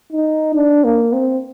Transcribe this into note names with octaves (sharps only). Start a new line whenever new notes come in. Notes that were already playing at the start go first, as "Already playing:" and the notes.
D#4
D4
A#3
C4